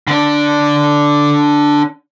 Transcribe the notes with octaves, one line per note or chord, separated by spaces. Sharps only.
D3 D4